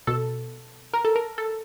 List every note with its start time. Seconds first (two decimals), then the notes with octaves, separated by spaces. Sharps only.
0.07 B2 A4
0.93 A#4
1.05 A4
1.16 A#4
1.38 A4